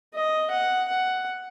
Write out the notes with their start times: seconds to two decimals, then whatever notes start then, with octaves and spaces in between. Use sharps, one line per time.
0.15 D#5
0.51 F#5
0.88 F#5